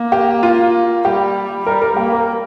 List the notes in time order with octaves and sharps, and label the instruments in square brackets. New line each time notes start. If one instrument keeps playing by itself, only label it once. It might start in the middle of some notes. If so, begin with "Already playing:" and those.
Already playing: [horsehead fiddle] A#3
[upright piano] G4
F4
[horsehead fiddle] G3 [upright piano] G4
[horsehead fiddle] G3 [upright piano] A#4
[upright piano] A#4
[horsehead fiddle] A#3 [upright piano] G4
[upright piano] A#4